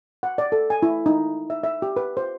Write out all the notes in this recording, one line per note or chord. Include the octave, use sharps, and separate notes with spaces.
F#5
D5
A4
G#5
E4
D#4
E5
E5
G4
B4
C5